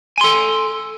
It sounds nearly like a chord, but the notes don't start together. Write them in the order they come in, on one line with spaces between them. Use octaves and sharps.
G#5 C6 A4